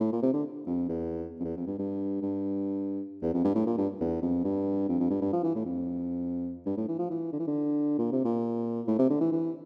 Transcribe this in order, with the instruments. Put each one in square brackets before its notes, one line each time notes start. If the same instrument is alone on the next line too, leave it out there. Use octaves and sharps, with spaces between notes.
[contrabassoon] A2
A#2
C3
D3
F2
E2
F2
E2
F2
G2
G2
G2
E2
F2
G2
A2
A#2
G2
E2
F2
G2
F2
F2
G2
G2
F3
E3
A2
F2
G2
A2
E3
F3
E3
D3
E3
D3
A#2
C3
A#2
A2
C3
D3
E3
E3